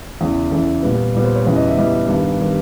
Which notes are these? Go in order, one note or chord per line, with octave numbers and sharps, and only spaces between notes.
E2 C#3 E3
E2 C#3 E3 A4
A#2 G3 B3
A#2 G3 B3
C5
C#5
E2 C#3 E3 G3 B3
D#5
E5
E2 C#3 E3 G3 B3 D#5
G2 D#3 G3 B3
D#3 G3 B3